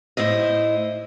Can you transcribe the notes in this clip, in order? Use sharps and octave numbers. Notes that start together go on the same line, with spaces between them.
A2 E4 C5 D#5